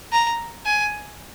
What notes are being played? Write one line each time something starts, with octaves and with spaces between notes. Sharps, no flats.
A#5
G#5